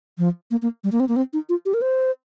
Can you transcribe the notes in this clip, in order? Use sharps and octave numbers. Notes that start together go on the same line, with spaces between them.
F3
A#3
A#3
G3
A#3
C4
A#3
C4
D#4
F4
G4
A#4
C5